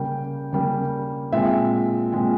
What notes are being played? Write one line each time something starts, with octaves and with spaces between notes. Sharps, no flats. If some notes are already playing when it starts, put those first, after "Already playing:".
Already playing: C#3 G3 A#3 G5
C#3 G3 A#3
A#2 G#3 C4 E5
A#2 G#3 C4